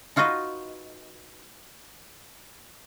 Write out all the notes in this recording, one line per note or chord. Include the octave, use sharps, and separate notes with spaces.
D#4 F4 F#4 B4 D#5